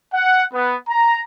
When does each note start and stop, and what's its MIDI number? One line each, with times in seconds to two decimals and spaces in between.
0.13 0.43 78
0.53 0.75 59
0.88 1.21 82